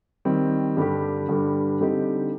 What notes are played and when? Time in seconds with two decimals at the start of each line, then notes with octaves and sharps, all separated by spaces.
0.25 D#3 G3 C4
0.77 G2 D3 G3 D4 G4
1.28 G2 D3 G3 D4 G4
1.81 D3 G3 C4 D#4 G4